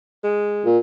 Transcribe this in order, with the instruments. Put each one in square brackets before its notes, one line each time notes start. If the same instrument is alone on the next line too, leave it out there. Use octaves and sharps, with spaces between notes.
[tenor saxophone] G#3
[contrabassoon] A#2